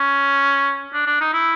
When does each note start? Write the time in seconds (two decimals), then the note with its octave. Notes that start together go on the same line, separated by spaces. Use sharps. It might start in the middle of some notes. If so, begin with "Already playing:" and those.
Already playing: C#4
0.94 D4
1.06 D4
1.21 D#4
1.33 E4